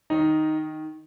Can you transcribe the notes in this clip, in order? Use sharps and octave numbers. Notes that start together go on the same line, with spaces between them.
D#3 D#4